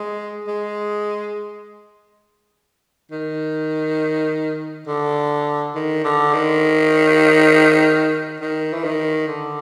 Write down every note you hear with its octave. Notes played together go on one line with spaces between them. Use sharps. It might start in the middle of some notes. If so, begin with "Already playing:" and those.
Already playing: G#3
G#3
D#3
D3
D#3
D3
D#3
D#3
E3
D#3
D3